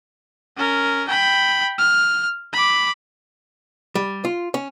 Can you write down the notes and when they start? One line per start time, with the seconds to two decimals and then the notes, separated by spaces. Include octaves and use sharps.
0.57 C#4 A#4
1.08 G5 B5
1.78 F6
2.53 B5 D6
3.95 G3
4.25 F4
4.54 C#4